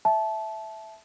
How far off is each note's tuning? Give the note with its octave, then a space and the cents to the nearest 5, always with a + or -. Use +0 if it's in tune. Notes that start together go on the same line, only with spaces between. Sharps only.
E5 +0 A5 -20